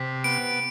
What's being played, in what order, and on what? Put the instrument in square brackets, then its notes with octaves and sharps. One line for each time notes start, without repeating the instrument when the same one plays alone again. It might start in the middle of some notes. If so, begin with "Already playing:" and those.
Already playing: [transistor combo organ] C3 [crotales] B6
[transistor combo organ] B3 [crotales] D7